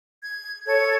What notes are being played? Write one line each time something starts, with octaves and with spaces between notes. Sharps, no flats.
G#6
A4 C#5 G#6